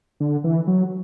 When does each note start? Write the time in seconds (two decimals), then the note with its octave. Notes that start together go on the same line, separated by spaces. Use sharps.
0.20 D3
0.44 E3
0.67 F#3